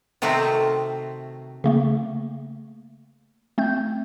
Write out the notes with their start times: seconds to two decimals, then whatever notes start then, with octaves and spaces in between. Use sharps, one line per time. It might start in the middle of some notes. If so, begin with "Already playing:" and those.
0.22 C3 D#3 A3 C4 F#4
1.64 C#3 A3 A#3
3.58 A3 C4 G6